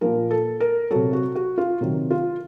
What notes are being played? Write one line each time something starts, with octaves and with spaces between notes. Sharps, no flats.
A#2 F3 A#4
A4
A#4
C3 F#3 A4
F#4
F#4
F4
C3 D#3 F#3
F4